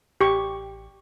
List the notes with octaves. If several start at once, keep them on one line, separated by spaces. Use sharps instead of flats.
A1 G4 C#6